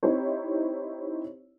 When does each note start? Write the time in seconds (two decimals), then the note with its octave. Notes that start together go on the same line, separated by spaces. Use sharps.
0.03 C4 D#4 E4 G4 C5 C#5